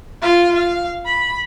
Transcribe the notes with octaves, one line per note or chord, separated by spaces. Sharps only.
F4 F5
F5
B5